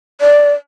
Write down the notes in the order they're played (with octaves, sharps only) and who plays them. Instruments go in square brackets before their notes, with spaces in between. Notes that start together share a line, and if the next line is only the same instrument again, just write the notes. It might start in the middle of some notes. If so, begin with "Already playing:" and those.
[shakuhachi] D5